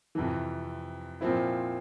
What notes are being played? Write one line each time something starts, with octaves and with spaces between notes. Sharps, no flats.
F2 C3 E3
A#2 F3 C4 E4